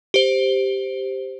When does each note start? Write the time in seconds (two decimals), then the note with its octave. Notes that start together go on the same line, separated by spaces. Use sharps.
0.14 G4 C5